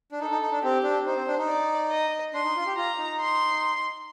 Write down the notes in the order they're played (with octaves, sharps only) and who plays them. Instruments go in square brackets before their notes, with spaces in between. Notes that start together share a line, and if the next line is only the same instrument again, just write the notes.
[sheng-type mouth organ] D4
[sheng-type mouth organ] D#4 [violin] A4
[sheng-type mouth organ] D#4
D#4
D4
[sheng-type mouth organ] C4 [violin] G4
[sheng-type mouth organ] D4
[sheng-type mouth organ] D#4 [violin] C5
[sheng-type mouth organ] C4
D4
D#4
[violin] D5
D#5
[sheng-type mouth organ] D4 [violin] C6
[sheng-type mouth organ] D#4
F4
G4
[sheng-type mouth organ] F4 [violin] A#5
[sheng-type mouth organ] D#4
[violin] C6